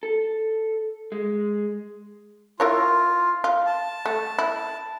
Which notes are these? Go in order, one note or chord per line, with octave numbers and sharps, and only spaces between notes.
A4
G#3
E4 F4 A#4 C#5
F4
A5
A3
E4